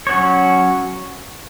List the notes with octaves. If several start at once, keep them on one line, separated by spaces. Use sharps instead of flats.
F#3 C#4 F#4 C#5